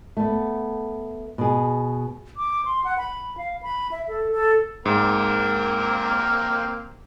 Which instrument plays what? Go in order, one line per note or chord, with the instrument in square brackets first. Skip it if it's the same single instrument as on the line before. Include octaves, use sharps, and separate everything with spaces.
[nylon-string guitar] A3 B3
B2 G#4
[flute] D6
C6
F#5
B5
F5
B5
E5
A4
A4
[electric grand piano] G#2 [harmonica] A#3 C4 A#4